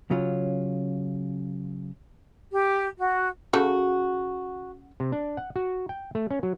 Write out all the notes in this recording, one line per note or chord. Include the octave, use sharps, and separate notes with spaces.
C#3 F#3 C#4 F4
G4
F#4
C#3 F#4 A4
C3
D4
F#5
F#4
G5
A3
C#4
F#3